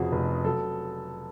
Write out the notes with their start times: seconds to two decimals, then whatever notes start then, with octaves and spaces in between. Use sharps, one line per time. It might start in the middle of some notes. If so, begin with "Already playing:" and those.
Already playing: F1 F2 C#3 F#4 G#4
0.12 F1
0.44 F#3 A4